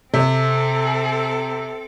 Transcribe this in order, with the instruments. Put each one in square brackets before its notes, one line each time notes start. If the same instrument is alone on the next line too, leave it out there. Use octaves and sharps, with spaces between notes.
[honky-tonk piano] C3 [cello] C4 A4